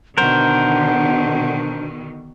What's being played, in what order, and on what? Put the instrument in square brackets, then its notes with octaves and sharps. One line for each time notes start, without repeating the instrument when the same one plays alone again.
[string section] B2 D3 D#3 [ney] D4 [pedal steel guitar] A#4 C5 [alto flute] F#5